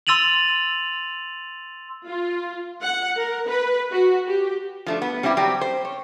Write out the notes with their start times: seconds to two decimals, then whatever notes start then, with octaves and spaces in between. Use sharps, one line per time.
0.07 C6 E6 A6 D#7 F7 F#7
2.07 F4
2.82 F#5
3.17 A#4
3.47 B4
3.92 F#4
4.27 G4
4.86 F3 A3 D4
5.02 B3
5.23 G3 C4 D4 E4 G4
5.37 F#3 G3 C4 G4
5.61 C5
5.85 C#5